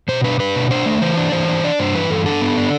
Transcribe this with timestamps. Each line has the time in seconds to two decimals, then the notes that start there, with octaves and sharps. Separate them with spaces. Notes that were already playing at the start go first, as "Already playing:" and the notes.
0.08 B2 C5
0.24 D4 B4
0.40 D4 B4
0.55 B2
0.71 D4 C5
0.86 A3
1.01 E3 C5
1.17 D4
1.32 E3 C5
1.48 D4
1.64 D4 D5
1.79 G2 C5
1.95 E3 B4
2.10 G2 A4
2.26 D4 A4
2.42 B3
2.57 D4